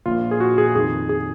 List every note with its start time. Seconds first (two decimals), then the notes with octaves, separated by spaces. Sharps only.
0.06 A#1 A#2 F4
0.31 G#4
0.40 F#4
0.58 G#4
0.75 F2 D#3 G#4
1.09 G#4